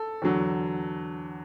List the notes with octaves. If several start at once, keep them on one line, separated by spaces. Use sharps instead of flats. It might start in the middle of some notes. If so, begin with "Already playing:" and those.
Already playing: A4
E2 D3 F#3